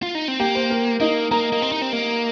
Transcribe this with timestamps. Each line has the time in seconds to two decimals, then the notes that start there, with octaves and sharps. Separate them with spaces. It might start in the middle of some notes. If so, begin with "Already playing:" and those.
0.03 F4
0.15 D#4
0.28 C4
0.39 A#3 G4 G5
0.55 C5
0.70 A#4
1.00 A#3 D#4 D#5
1.31 A#3 A#4 A#5
1.52 A#3
1.62 C4
1.72 D#4
1.82 C4
1.93 A#3